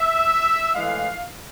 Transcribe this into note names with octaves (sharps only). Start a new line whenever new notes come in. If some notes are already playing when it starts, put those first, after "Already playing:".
Already playing: E5
A2 E3 G#3 F5